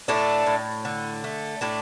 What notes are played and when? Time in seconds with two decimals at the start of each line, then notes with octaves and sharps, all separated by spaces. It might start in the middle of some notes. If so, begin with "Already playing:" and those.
0.08 A2 A3 D4
0.47 A2
0.85 D3
1.24 A3
1.61 A2 A3 D4